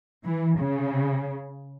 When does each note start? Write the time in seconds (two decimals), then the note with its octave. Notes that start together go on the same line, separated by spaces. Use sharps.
0.25 E3
0.60 C#3